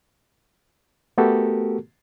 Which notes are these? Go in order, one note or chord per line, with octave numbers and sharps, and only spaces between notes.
A3 B3 F#4 G4 A4 A#4